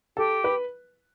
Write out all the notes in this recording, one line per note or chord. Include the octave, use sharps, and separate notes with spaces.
G4 A4
B4